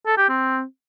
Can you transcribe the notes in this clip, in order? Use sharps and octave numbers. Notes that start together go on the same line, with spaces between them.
A4
G4
C4